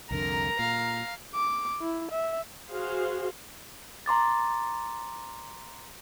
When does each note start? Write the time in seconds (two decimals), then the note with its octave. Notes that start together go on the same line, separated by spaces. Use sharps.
0.11 C2 F2 D3 A#4 A#5
0.59 A#2 F5
1.34 D6
1.81 E4
2.11 E5
2.70 F#4 G#4 C5 F5
4.06 A#5 C6 D6 A6